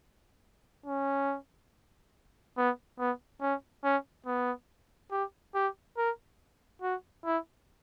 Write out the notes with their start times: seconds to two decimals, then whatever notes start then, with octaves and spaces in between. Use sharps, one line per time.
0.86 C#4
2.57 B3
2.99 B3
3.41 C#4
3.84 C#4
4.26 B3
5.11 G4
5.55 G4
5.98 A#4
6.82 F#4
7.25 E4